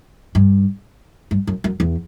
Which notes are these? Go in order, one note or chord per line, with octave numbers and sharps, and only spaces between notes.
G2
G2
F#2
F#2
E2